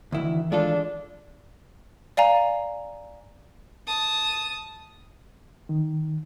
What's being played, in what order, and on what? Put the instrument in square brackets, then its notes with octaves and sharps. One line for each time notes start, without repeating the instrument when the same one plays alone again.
[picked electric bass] G#1 D#3 E3 [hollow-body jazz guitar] D2 E4
[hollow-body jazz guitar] G#3 F4 A4 [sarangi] D4
[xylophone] D5 F5 G#5 A#5
[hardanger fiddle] A5 D#6
[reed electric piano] D#3